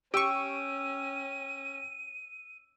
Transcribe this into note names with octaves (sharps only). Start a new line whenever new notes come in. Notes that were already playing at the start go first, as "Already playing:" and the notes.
C#4 G4 G5 C#6 E6 D7 D#7